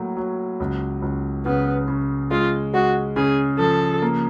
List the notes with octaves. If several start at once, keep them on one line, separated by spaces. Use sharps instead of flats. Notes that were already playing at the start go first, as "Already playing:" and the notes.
Already playing: A2 F#3 A#3
F#3
C#2
C#2
C#3 B3
C#3
G#3 F4
G#3 F#4
C#3 G#4
F3 A4
A#3